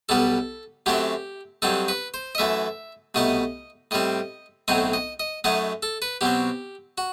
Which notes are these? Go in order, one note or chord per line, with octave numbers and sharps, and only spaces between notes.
B1 B2 G3 B3 A4
F#2 F#3 A3 C4 G4
G2 F#3 C4 D#4 A4
B4
C5
D#5
F#2 E3 A3 E5
C2 B2 A3 D#4 D#5
A2 G3 C4 D#5
B1 A2 F#3 C4 D#4 D#5
D#5
D#5
F#2 F#3 A3 D#4 D#5
A4
B4
B2 F#3 C4 G4
F#4